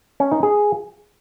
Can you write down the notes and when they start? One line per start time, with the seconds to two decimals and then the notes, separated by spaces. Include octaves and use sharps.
0.20 C#4
0.31 D#4
0.43 G#4